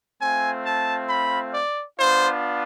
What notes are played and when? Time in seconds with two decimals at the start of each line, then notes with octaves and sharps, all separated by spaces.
0.21 A3 C4 F4 G#5
0.66 A5
1.09 B5
1.53 D5
1.98 B3 D4 F4 C5